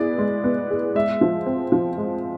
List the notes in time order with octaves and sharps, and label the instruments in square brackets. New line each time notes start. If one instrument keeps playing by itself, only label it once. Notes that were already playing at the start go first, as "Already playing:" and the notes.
Already playing: [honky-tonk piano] B3 E4 G#4 [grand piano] D5
[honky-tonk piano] G#3
B3
G#4
[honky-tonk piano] G#3 [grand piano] E5
[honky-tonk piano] F3
C4
F3
G#3